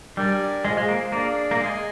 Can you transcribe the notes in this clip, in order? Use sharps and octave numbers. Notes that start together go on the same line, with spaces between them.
G3 D4 G4 A#4 D5 G#5
G#3 F4 G#4 C5
G#3
A#3
A#3 D4 G#4 D5
A#3
G#3 G#4 D#5 G#5